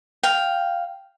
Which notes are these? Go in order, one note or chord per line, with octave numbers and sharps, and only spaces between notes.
F5 G5